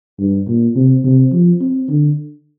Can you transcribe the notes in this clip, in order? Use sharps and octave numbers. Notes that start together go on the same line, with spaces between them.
G2
A#2
C3
C3
F3
C4
D3